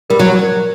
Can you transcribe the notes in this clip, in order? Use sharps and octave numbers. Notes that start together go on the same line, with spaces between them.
G3 A#4
F#3